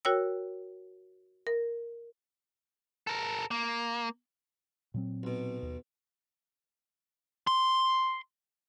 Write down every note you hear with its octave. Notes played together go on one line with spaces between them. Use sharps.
F#4 A#4 C#5 G5 E6
A#4
A4 A#4
A#3
A#2 F#3 C4
B1 B2
D#2
C6